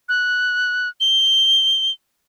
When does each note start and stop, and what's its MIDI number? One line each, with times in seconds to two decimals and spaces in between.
0.09 0.89 90
1.00 1.91 103